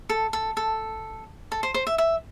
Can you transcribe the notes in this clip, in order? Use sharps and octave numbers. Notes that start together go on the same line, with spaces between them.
A4
A4
A4
A4
C5
C5
E5
E5